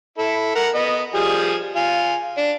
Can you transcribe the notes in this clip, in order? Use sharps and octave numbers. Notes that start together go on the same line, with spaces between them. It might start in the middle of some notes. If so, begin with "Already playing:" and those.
E4 A4
A#4 F#5
B3 D#5
F3 G3 G#4
F4 G#5
D4